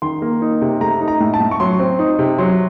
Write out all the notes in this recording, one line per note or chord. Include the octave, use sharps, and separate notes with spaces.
D#3 C6
A#3
D#4
C3
A3 A#5
D#4
A#5
A2
A5
A2
C#6
F#3 C6
C4
D#4
C3
F#3 C6